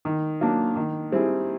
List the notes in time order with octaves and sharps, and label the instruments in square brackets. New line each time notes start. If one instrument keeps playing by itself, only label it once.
[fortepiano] D#3
F#3 A#3 D4
D#3
G3 C4 E4 G#4